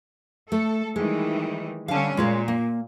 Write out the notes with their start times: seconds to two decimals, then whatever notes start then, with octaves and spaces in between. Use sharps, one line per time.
0.52 A3 A4
0.96 D#3 E3 G3 G#3
1.88 D3 G3 C#4 F5 A5
2.17 A#2 G#3 F4 C#5
2.48 A#3